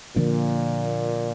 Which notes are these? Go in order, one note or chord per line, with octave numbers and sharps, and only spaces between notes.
A#2 D3 F3 A#3 D4